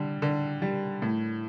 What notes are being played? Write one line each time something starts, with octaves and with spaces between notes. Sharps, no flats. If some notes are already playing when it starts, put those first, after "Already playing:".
Already playing: D3 G3
D3
G3
A2